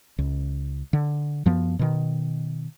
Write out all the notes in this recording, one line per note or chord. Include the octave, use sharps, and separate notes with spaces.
C#2
D3
F#2 F3 B3
B2 D#3